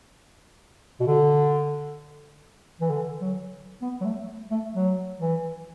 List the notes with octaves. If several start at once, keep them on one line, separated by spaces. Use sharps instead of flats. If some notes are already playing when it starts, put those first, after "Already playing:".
B2
D3
E3
D3
F#3
B3
F#3
A3
A3
F#3
E3